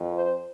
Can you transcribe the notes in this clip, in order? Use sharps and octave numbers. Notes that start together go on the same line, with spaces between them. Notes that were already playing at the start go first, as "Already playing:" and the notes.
Already playing: F2
C5